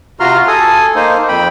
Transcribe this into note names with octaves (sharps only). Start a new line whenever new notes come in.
C3 F4 F#4 A#5 C6 F6
A4 G#5 D#6
A#3 D#4 C5
F2 G5 B5